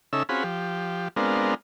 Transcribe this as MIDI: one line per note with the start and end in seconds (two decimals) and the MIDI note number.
0.13 0.23 49
0.13 0.23 61
0.13 0.23 63
0.13 0.23 69
0.13 0.23 76
0.13 0.23 88
0.29 0.43 60
0.29 0.43 61
0.29 0.43 65
0.29 0.43 66
0.29 0.43 68
0.29 0.43 83
0.44 1.08 53
0.44 1.08 67
1.16 1.54 56
1.16 1.54 59
1.16 1.54 60
1.16 1.54 62
1.16 1.54 65
1.16 1.54 70